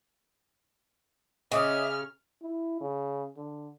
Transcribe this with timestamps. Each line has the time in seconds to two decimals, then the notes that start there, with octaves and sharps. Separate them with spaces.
1.52 C#3 C#4 D#5 E5 D6 D#6 F6
2.43 E4
2.81 C#3
3.37 D3